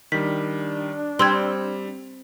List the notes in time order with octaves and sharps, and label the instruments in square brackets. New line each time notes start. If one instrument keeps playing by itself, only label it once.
[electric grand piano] D#3 G3 [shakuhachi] D4 [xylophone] B6
[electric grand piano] G3 [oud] C4 [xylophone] C6 E6 G#6